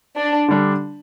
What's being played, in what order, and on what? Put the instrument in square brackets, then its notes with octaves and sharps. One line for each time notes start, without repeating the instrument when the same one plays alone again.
[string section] D4
[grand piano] D3 G3 D4 A4